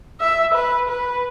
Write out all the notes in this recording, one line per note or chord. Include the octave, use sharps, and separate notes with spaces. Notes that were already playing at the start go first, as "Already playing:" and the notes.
E5
B4
B4